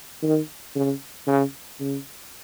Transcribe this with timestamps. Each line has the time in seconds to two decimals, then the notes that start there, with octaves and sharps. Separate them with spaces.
0.22 D#3
0.75 C#3
1.27 C#3
1.80 C#3